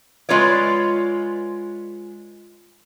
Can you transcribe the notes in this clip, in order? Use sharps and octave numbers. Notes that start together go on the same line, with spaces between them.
G#3 F4 B4 C#5 D5